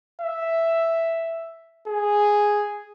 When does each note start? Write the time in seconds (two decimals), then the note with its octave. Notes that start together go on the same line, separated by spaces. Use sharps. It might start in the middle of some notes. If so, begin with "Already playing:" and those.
0.21 E5
1.87 G#4